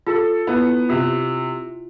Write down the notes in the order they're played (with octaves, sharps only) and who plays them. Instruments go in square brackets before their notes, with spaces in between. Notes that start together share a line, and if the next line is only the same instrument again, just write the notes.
[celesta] F4 [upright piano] A4
[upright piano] B3 [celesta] E4
[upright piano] C3 [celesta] F4